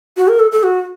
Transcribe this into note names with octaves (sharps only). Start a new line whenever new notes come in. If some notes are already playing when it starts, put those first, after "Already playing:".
F#4
A#4
A4
A4
F#4